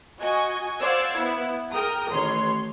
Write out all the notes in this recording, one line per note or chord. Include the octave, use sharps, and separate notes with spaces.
F#4 D#5 G#5 C#6
C5 D5 F5 F#5 E6 G#6
B3 E4
G#4 A#4 G5 A#5 D#6
A1 D#3 C#5 C6